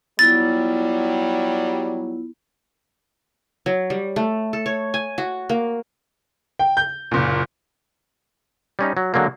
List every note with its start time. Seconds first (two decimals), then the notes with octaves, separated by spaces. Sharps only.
0.19 F#3 G3 B3 E4 F4 A6
3.66 F#3
3.90 G3
4.16 A3
4.53 A4
4.66 C#5
4.94 G#5
5.18 F#4
5.49 A#3
6.59 G5
6.77 G6
7.11 F#1 A#2
8.79 G3 C#4 D#4
8.97 F#3
9.14 D3 F#3 G#3 A#3